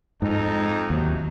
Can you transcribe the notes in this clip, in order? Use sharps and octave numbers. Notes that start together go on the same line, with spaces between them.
F2 G#2 D#4
D#2 C3 F#3